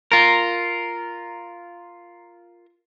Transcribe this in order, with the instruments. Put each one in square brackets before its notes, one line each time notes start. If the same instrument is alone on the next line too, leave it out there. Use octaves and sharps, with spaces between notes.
[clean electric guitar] F4 A#4